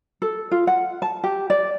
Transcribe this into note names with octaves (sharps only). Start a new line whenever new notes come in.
A4
F4
F#5
A5
G4
D5